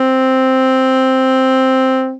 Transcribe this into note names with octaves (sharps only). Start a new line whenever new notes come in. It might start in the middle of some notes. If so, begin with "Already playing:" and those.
Already playing: C4